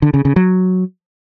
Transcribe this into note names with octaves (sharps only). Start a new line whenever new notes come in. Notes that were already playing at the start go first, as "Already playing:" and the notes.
D3
C#3
C#3
F#3